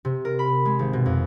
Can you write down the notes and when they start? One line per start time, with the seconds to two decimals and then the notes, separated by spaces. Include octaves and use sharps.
0.05 C3
0.25 A#4
0.39 B5
0.65 G#3
0.79 G#1
0.93 B2
1.06 F2